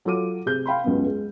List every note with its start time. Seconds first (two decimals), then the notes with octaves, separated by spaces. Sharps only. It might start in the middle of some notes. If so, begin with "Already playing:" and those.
0.05 F#3 F4 A4 D6 D#7
0.46 C3 G#4 G6
0.66 F5 G5 B5 C6
0.84 C#2 F#2 B3
1.06 G#3